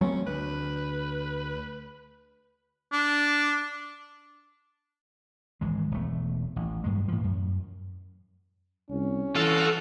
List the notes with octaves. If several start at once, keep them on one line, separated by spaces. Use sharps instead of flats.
F#3 A3 C4 C#4
D2 B4
D4
G#1 E3 G#3
E1 A3
A1
G2 F#3 G#3
A2 E3 F3
F#2
C2 C#4
E3 F4 F#4 A4